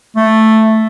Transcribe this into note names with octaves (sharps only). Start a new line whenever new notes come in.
A3